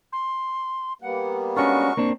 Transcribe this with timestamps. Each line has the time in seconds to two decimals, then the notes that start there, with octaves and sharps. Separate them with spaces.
0.12 C6
1.02 G3 A#3 B3 F#5
1.56 G#3 C#4 D4 F#4 A#4 C#6
1.97 A#3 C4 D4